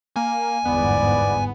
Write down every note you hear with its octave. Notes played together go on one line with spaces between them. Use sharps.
A#3 G#5
G1 E2 G#2 B3 D5